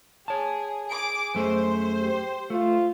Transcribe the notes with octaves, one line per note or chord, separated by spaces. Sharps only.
G#4 C#5 A5
G#4 D6 D7
F#2 A3 G#4 C5
G4
A3 F4